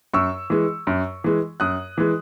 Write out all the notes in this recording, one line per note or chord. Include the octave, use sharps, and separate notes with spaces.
F#2 C#6 E6
E3 G#3
F#2
E3 G#3
F#2 D#6 F#6
E3 G#3